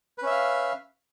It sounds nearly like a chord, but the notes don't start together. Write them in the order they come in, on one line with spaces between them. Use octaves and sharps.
B4 C#4 E5 F5